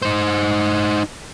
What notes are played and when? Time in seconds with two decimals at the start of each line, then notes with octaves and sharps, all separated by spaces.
0.02 D#4 C5